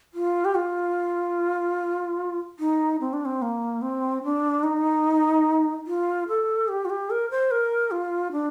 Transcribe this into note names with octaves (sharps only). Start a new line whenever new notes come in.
F4
G4
F4
D#4
C4
D4
C4
A#3
C4
D4
D#4
F4
A4
G4
F4
G4
A#4
C5
A#4
F4
D4